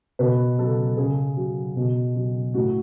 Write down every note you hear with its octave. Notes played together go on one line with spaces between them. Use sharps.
B2 B4
F#3 A4
C#3 G#4
F#3
B2
F#3
A2 F#4